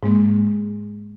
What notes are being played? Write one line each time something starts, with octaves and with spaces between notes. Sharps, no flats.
G#2 G#3 A#3